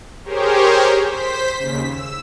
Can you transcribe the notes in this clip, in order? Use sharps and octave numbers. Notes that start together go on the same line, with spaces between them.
G4 G#4 A#4 C5 C#5
C5 B6
D#2 C#3 B6
E6